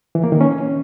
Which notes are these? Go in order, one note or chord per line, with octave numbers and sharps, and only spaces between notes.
E3
A#3
D#3
C#4